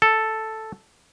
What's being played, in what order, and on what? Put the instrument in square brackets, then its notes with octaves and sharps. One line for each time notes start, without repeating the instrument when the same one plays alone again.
[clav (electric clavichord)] A4